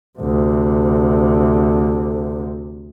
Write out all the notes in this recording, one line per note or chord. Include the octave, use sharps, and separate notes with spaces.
D2 C3